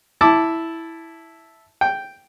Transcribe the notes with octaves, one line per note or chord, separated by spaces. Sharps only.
E4 A5 D6
G5